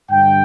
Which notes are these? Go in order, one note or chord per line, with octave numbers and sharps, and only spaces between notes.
G2 D3 G5